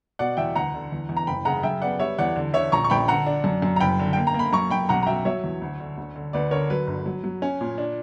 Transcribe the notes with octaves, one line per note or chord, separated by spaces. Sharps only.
B2 D5 F#5
E2 E5 G5
D2 F#5 A#5
D3
E2
E2
A#5
F#1 G5 B5
C#3 F#5 A#5
F#2 E5 G5
B3 D5 F#5
G3 C#5 E5
E2 D5 F#5
D3
D3 C#5 E5
A#1 A#5 C#6
C#6
A#1 G5 B5
D3 F#5 A#5
D4
F#2
F#2
A#5
F#1 G5 B5
D3
A#3 G5
A#5
A#3
B5
F#2 A#5 C#6
F#2 G5 B5
B1 F#5 A#5
A#5
F#3 E5 G5
F#3 C#5 E5
E2
D2
D3
D2
D3
D2 B4 D5
D3 A#4 C#5
F#3 B4
G1
F#3
F#3
C#4
A#2
D4